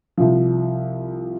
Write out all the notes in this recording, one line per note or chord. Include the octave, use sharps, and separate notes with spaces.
C2 F3